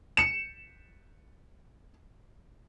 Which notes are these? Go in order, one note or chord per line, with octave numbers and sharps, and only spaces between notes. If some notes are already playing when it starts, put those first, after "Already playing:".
C#7 E7